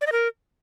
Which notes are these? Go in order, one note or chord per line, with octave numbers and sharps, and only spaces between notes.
D5
D#5
A#4